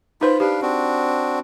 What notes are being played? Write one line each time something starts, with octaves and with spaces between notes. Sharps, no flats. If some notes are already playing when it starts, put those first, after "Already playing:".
D#4 F4 B4 C5 B5
D4 G4 B4 F5
C4 D4 F#4